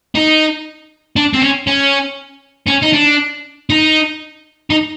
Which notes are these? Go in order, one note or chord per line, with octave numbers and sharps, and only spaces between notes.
D#4
D4
C4
C#4
C#4
C#4
D#4
D4
D#4
D#4